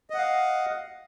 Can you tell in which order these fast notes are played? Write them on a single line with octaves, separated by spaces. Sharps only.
D#5 F#5 F5